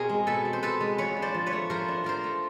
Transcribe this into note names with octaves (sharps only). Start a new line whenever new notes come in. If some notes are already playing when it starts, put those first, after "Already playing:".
Already playing: B2 C4 G#4 A#4
G#3
B2 A4 B4
C4
C5
B2 A4 B4
G#3
F3 B4 C#5
D4
C5 D5
F3
B4 C#5
A3
F3 A#4 C5
D4
F3 A#4 C5
A3